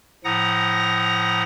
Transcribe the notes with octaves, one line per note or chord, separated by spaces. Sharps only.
A2 F3 F#5 A#5 D#6 A#6